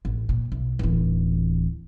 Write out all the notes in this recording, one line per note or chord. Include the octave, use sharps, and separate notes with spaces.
A1
A#2
B1
D1 E3